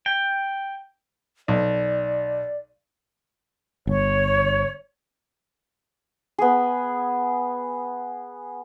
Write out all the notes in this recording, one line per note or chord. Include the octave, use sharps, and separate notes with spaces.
G5
B1 D5
G1 C#5
B3 G#4